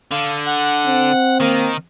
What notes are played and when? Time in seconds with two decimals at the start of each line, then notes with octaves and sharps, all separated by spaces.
0.12 D3 F5
0.46 F#5
0.87 C4
1.40 D#3 A#3